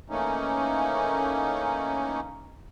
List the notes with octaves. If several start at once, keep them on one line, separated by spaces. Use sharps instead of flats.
E3 A3 A#3 C#4 D#4